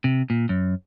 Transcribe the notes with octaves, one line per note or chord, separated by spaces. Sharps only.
C3
A#2
F#2